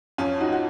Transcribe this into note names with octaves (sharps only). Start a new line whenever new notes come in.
F2 C#4 F4
F3 D#4 F#4
F#4